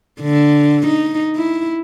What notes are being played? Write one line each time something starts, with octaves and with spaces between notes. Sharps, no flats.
D3
D#4
E4